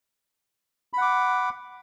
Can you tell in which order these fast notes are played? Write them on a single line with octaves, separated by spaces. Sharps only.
B5 F#5 D6